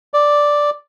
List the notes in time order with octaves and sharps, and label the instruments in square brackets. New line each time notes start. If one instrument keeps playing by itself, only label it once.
[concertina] D5